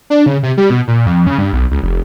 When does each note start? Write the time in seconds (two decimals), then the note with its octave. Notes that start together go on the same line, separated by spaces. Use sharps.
0.10 D4
0.26 C#3
0.43 C3
0.57 G3
0.70 B2
0.88 A#2
1.06 F2
1.27 C#3
1.38 G2
1.53 B1
1.71 C#2
1.83 F1